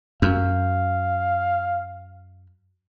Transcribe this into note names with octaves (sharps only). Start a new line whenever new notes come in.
F#2 F5